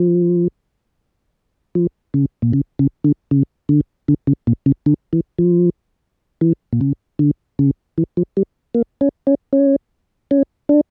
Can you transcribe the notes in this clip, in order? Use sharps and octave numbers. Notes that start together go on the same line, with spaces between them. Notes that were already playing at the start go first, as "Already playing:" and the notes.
Already playing: F3
F3
C#3
A#2
C#3
C#3
D3
C#3
D3
D3
C#3
A#2
C#3
D3
E3
F3
E3
A#2
C#3
D3
C#3
E3
F3
G3
A#3
C#4
C#4
C#4
C#4
D4